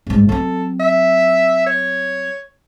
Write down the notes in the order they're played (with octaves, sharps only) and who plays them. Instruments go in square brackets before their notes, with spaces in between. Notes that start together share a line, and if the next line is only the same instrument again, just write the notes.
[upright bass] G#1 G#2
[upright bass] F#3 C4 [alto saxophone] A4
[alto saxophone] E5
C#5